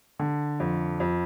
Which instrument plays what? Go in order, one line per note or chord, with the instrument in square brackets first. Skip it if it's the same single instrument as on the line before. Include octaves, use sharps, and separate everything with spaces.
[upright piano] D3
F2
F2